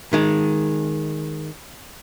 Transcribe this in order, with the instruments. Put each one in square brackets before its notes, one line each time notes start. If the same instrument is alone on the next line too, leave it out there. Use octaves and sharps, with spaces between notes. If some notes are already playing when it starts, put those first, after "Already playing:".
[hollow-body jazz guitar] D#3 G#3